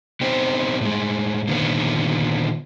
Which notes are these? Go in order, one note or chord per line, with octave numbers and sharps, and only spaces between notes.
B3 C4 D#4 G4 C5
A2 G#3
A#2 D3 D#3 B3